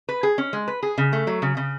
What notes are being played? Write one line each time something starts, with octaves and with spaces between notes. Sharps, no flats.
B4
G#4
C#4
G#3
B4
G#4
C#3
A3
F#3
C#3
C#3